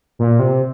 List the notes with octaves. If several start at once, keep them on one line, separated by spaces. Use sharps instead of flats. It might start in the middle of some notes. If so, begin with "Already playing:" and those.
A#2
C3